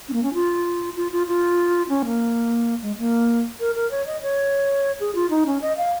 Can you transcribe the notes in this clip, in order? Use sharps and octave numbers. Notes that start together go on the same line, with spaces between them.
C#4
A#3
C#4
F4
F4
F4
F4
C#4
A#3
G#3
A#3
A#4
A#4
C#5
D#5
C#5
G#4
F4
D#4
C#4
D#5
F5